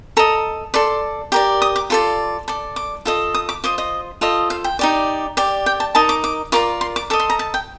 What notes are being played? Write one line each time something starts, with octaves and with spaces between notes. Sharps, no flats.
A4 D#5 A#5
A4 D5 C6
G4 A#4 D5
D#6
D6
F4 A4 D5 C6
A4 D5
D6
F4 A4 D#5
D#6
D6
F4 C5 D#5 D6
D#5
F4 A4 C5 D#5
F5
G5
D#4 G4 D5
G4 D5
G5
A5
D#4 A#4 D#5 A5
D6
D6
F4 A#4 D5 D6
C6
D6
A4 D#5 D6
C6
A#5
A5
G5